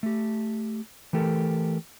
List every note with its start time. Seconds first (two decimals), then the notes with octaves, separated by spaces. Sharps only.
0.03 A3 G4
1.13 E3 A3 G4 A4 A#4